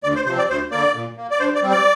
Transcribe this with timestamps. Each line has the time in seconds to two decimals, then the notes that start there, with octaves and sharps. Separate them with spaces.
0.03 D2 D5
0.16 C5
0.26 C3 F3 C4 C5
0.38 D5
0.49 D2 C5
0.71 D3 A#3 D5
0.95 A#2
1.17 A#3
1.31 D5
1.40 G2 C5
1.55 D5
1.63 G3 C4
1.71 D5